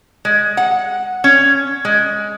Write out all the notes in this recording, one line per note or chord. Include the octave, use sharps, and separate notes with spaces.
G#3
F#5
C#4
G#3